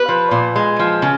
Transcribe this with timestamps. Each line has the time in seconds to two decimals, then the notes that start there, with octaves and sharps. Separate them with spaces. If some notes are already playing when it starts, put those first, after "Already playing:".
Already playing: B4
0.08 F3
0.31 A#2
0.56 G#3
0.79 F3
1.02 C#3